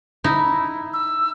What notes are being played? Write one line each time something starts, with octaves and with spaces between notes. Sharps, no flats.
D#4 E4
E6